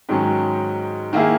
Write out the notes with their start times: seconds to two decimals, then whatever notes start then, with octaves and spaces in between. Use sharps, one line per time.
0.09 G#2 D#3 F#3 C#4
1.13 D#3 A#3 E4 G#4